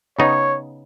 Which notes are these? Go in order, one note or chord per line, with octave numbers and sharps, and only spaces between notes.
C#3 B3 D#4 C#5